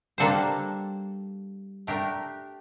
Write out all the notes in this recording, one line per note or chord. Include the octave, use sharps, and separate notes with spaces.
G3 A#3 D4 A4 C5
A3 D4 G4 A#4